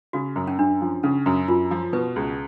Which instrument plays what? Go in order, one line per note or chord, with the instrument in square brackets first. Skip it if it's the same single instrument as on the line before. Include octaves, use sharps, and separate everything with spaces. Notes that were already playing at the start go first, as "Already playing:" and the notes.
[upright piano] C#3 [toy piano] F#4
[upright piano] F#2
[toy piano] C#4
[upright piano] F#2 [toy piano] D4
[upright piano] F3
[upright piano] C#3 [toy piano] C#4
[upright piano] F#2
[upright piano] F#2 [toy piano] F4
[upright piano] F3
[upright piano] B2 [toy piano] B4
[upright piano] C#2